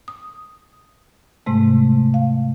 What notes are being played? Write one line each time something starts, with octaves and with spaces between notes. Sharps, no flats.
D#6
G#2 C3 G#3 A3
F5